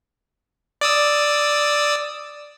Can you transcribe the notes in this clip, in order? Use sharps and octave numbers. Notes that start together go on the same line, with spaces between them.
D5 D#6 E6